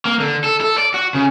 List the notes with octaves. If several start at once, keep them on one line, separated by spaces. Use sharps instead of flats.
A#3
D3
A4
A4
D5
F#4
C#3